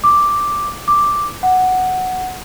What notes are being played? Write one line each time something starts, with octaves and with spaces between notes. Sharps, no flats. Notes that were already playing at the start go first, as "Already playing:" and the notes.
D6
D6
F#5